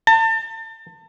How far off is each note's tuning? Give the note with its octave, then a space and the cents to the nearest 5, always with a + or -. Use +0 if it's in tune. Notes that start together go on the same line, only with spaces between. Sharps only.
A5 +35